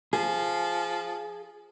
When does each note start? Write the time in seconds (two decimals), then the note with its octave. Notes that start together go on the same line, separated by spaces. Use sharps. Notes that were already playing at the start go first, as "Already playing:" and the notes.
0.13 F3 G#4